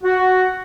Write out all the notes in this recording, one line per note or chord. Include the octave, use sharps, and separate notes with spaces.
F#4